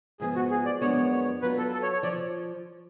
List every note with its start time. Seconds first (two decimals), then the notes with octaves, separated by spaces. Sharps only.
0.20 G#2 F3 B3 G#4
0.36 F#4
0.50 G#4
0.66 D5
0.81 F#2 F3 G#3 B3 D4 C#5
0.96 C#5
1.11 C#5
1.42 F#3 B3 F4 B4
1.58 A4
1.73 A4
1.83 C#5
1.93 C#5
2.03 F3 D5